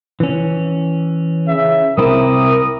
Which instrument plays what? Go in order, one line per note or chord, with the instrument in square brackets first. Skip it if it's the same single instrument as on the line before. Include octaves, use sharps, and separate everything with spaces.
[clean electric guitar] E3 C#4
[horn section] C#3 E5
[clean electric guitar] C2 C4 E4 [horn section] A#4 [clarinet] D#6